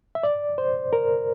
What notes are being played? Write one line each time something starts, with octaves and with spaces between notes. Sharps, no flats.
E5
D5
C5
A#4